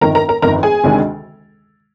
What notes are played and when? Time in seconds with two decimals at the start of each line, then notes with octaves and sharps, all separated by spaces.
0.01 G1 F2 D#3 A#4 A#5
0.15 A#4 A#5
0.29 A#4 A#5
0.42 G1 F2 D#3 A#4 A#5
0.63 G#4 G#5
0.84 D2 C3 D#3 G#3 D4